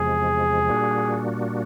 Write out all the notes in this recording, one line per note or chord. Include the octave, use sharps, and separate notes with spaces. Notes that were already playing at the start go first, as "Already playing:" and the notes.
Already playing: E2 C3 F3 G#3 G#4
A#2 G3 A#3 D4 F#4